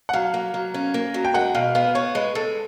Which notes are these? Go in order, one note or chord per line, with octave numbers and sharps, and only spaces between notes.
F#5
F#3 F5
A#3
F#3
C#4
A#3
F#3
G5
G#3 F#5
B2 F5
B3 F5
B3 C#5
G#3 B4
G#3 A4